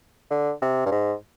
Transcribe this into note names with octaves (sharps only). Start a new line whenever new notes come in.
D3
C3
G2
G#2